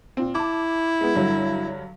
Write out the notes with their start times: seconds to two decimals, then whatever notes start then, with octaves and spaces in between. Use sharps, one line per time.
0.17 A#2 C4
0.35 E4 A5 D6
1.01 G#3 B3
1.15 G2 D3 F#3